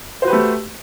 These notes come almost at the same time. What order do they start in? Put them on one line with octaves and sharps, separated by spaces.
C5 F#4 B4 G4 A3